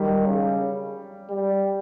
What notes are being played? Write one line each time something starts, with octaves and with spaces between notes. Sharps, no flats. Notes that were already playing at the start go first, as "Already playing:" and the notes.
Already playing: D#3 G3
C#3
G3